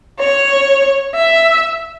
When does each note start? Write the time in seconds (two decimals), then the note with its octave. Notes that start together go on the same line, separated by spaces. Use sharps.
0.19 C#5
1.14 E5